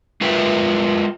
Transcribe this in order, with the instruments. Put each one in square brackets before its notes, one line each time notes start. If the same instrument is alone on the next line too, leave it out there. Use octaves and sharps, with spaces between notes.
[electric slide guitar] G#3 F4 A#4 B4 E5 G5